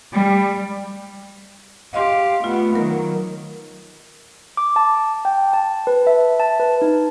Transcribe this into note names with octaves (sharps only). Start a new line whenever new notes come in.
G3
G4 D#5 F5 C6
A3 B3 F4
D#3 F#3 A#4
D6
A5
G5
A5
B4
E5
A5
B4
D#4